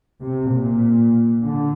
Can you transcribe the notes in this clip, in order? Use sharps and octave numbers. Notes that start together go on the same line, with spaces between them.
C3
A#2
D3